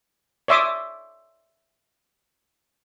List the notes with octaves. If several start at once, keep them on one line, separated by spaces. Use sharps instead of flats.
C#5 D5 E5 C6 D6 D#6